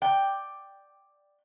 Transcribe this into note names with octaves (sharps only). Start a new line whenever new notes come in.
D5 G5